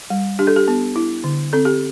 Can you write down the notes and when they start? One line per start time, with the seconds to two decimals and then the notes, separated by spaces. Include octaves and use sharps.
0.10 G3
0.39 D4 G4
0.47 A4
0.56 G4
0.68 B3
0.96 E4
1.24 D3
1.53 C4 A4
1.65 G4